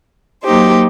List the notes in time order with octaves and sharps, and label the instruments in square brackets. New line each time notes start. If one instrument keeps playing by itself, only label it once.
[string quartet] F#3 A#3 D#4 G4 C5